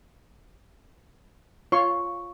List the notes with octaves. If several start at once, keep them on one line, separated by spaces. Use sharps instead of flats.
F4 C#5 C6 C#6